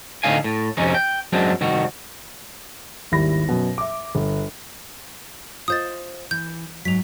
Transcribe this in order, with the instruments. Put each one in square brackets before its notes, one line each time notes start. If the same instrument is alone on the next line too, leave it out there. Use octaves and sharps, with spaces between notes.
[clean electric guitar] A2 D3 B3 D#4 F5 G#5
A2
F2 C3 C#4 D#4
G5
F#2 F#3 G#3 C4 D4
C2 D#3 F#4
[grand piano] G#1 D#2 G3 E4 B5 A#6
F#2 B2
E5 D6
G1
[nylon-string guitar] F4 C5 D#5 [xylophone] D#6 G6 A6
[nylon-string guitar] E3 [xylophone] G6
[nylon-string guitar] G#2 F#3 [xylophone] B6 F7